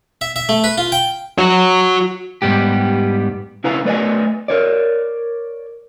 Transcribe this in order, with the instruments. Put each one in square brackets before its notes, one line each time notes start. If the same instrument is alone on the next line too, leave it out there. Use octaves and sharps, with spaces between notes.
[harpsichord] E5
E5
A3
B4
F4
G5
[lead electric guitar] F#4 C#5
[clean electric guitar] G#2 G3 B3 G4
C#3 E4 B4 F5 G#5 A#5
A3 B4 D5 D#5 G#5
A#4 C#5 D5